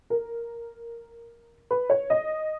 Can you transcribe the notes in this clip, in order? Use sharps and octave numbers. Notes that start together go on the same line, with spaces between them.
A#4
B4
C#5
D#5